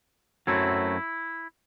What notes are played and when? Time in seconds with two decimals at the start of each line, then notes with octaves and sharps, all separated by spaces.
0.47 F#2 F#3 A3 C4 E4